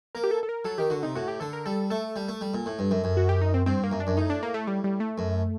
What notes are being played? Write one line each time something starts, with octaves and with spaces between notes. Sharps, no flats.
A#3 A#4
G4
A4
A4
A#4
F#3 A4
D#3 G4
D3 F#4
C3 D#4
A2 F#4
G4
D3 A4
A#4
G3 A4
A3 A4
G3
A3
G3
A#2
A2
G2
F#2
F#2
F#4
G4
D#4
C4
G2 C4
A#3
F#2
D4
F#2
A2 D#4
D4
A#3
A3
G3
G3
A3
F#2